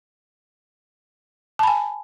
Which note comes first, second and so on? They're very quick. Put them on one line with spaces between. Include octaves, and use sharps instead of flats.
A5 B5 G#5